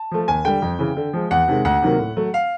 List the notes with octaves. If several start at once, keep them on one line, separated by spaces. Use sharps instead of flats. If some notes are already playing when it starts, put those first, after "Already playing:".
Already playing: A5
F3 A3
D#2 G#5
D3 G3 G5
F2
C#3 E3
D3
F3 G#3
E2 F#5
C3 D#3 G#3
D2 F#5
C3 D#3 F#3 A#3
A2
F#3 A3
F5